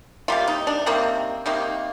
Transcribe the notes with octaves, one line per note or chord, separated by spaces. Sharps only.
C3 G3 A#3 F4
D#4
D4
C3 D#3 G3 A#3 C4
C3 D#3 G3 A#3